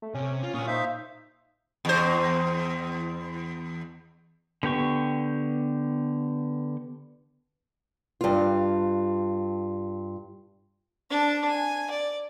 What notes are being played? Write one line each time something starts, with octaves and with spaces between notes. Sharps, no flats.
A3
C3 C#4
F4
A#2 C#4 F4 C#5 C#6 D#6
D#4 C5 E5 F5
E2 C5
D3 B3 G4 C#6
G2 F4
D4 A5
G#5
D5